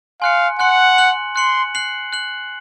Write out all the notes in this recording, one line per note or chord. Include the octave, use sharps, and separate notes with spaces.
F5 G#5 C6 F#6 C#7
F#5 G#5 C6 F#6 C#7
F#6 C#7 F#7
C6 F#6 C#7 F#7
F#6 C7 F#7
F#6 C7 F#7